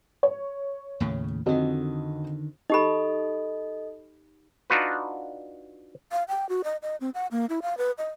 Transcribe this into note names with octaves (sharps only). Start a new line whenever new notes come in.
C#5
D#2 A2 C#3
F2 D3 D#3 F#4 D#5
D#4 G4 A4 D#5 B5
D4 D#4 F4 F#4 B4
F5
G5
F#4
D#5
D#5
C4
F#5
A#3
E4
F5
B4
D#5